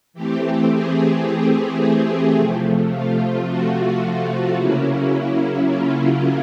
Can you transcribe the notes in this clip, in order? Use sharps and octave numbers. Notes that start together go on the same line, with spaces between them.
E3 A3 C4 G4
G#4
G4
G#4
C3 F3 A3
F4
F#4
F4
C#3 F#3 A#3 C#4 E4
F4